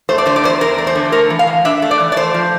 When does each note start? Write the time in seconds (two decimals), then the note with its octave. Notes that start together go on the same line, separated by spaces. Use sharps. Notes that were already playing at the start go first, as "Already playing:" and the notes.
0.09 A3 C5
0.18 D5
0.26 D3 C5
0.36 D5
0.44 E2 C5
0.61 E2 A#4
0.78 A3
0.87 C5
0.95 D3
1.12 A3 A#4
1.30 E3
1.39 F5
1.47 A2
1.65 D4 E5
1.82 A3
1.91 D5
2.00 E3
2.12 D5
2.16 A3 C5
2.34 F3